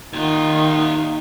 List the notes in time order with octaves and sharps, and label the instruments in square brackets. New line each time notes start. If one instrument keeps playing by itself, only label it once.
[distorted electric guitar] D#2 F4 [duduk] D#3 [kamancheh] D#4